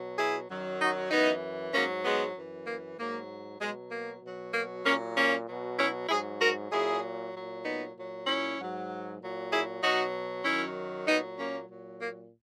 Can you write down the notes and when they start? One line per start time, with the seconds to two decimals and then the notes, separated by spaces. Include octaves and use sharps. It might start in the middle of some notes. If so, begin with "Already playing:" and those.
Already playing: B2 F#3
0.18 E4 G#4
0.49 F#2 D#3 F#3
0.80 D#4 F#4
1.11 F#2 E3 B3 D#4
1.74 G#2 F#3 A#3 C#4
2.04 G#3 B3
2.35 F#2 E3
2.67 A#3
2.98 G#2 F#3 A#3
3.60 B2 F#3 G#3
3.91 A#3
4.22 B2 F#3
4.53 A#3
4.84 A#2 F#3 A#3 C#4
5.16 A#3 C#4
5.47 B2 F#3
5.78 C#4 E4
6.09 G#2 F#3 E4 G#4
6.40 F#4 A#4
6.71 A#2 F#3 E4 G#4
7.33 A#2 F#3
7.64 B3 D#4
7.96 A#2 F#3
8.26 C#4 E4
8.57 G#2 F#3
9.20 A#2 F#3
9.51 E4 G#4
9.82 B2 F#3 D#4 F#4
10.44 F#2 D#3 F#3 C#4 E4
11.07 A#2 F#3 B3 D#4
11.38 A#3 C#4
11.69 A#2 F#3
12.00 A#3